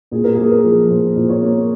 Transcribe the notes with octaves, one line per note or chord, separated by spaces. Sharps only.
A#2 G#4
A#4
A#3 G#4
A#4
F3
A#2 C5
A#2
C#5
A#3